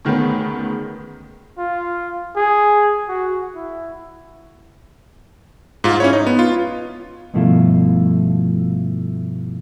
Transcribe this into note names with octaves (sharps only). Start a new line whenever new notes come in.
D2 D#3 G#3 B3 C#4
F4
G#4
F#4
E4
G#2 F4
C#4 E4 C#5
D#4
B3
F4
G2 B2 F3 A3 E4 F4